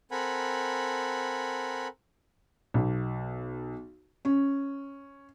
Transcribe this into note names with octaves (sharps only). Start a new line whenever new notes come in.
C4 A4 A#4 F#5 G#5 B5
B1
C#4